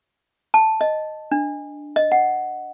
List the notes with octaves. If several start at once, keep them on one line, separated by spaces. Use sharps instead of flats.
A5
D#5
D4
D#5
F#5